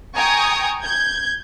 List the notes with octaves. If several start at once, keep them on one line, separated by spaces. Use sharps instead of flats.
G5 G#5 A#5 C#6 D#6 G#6
G6 G#6